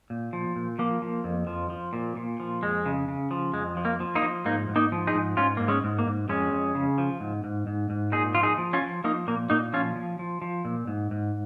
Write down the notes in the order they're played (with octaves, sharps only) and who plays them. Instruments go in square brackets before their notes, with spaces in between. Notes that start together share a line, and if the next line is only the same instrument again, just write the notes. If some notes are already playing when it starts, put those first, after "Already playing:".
[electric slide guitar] A#2
F3
A#2
F3 A#3
F3
F2
F3
F3
A#2
A#2
F3
F2 G#3
C#3
C#3
F3
F2 G#3
F3
A#3
F3
A#3 D#4
F3
G#2 A#3 D#4
G#2
A#3 D#4
F3
D#4 G#4
G#2
G#2 C#4 F4
G#2 A#3
G#3 C#4
G#2
A#3
G#2
F2 G#3 C#4
F2
C#3
F3
G#2
G#2
G#2
G#2
A#2 D#4 G#4
F3 F4
D#4 G#4
F3
C#4 F4
F3
F3 A#3 D#4
A#2 A#3
A#2 A#3 D#4
F3 C#4 F4
F3
F3
F3
A#2
G#2
G#2